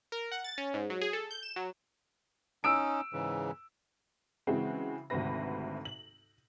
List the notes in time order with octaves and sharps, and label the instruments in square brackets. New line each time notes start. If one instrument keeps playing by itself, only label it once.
[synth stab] A#4
F#5
A6
C#4
G#2
F#3
G#4
A4
G6
E7
F#3
[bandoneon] C#4 D#4 [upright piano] E6 D7
[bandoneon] G#2 C#3 E3
[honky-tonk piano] C#3 E3 G#3 C4 F#4
G#1 D2 C3 C4 B4 A#6
F#7